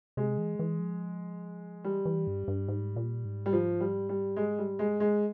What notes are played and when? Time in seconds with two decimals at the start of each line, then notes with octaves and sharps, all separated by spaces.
0.17 C3 G#3
0.38 E3
0.59 E3
0.79 F3
1.84 E3 G3
2.05 E3
2.27 G2
2.48 G2
2.68 G#2
2.96 A#2
3.25 G#2
3.46 G3
3.53 F3
3.80 G3
4.09 G3
4.36 G#3
4.58 G3
4.79 G#3
5.00 G#3